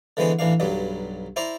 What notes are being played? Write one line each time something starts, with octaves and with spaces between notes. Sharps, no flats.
D3 E3 G#3 B3 C5
A1 E3 D4 F5
B1 G2 F#3 G3
E4 C5 D5 A#5